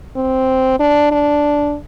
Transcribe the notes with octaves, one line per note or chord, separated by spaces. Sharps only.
C4
D4
D4